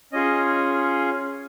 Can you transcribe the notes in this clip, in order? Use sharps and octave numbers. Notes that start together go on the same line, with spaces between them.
C#4 F4 G#4 D#5